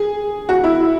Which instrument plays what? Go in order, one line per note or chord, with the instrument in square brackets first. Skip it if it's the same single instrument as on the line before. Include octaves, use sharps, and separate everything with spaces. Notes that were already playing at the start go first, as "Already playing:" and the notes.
Already playing: [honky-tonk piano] G#4
F#4
E4